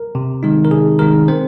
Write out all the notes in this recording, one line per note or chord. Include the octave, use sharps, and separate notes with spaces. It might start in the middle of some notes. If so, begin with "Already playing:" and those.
Already playing: A#4
C3
D#3 G#3 D#4
A#4
C3 G#4
D#3 G#3 D#4 A#4
C4 C5